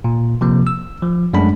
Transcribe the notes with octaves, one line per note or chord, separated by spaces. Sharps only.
A#2
C3 F3 A#3
E6
F3
F#2 G#3 A3 D4 B5